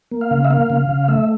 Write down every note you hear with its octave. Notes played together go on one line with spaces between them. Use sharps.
A#3
F5
C#3
E5
A#3 F5
C#3
C#3
A3 E5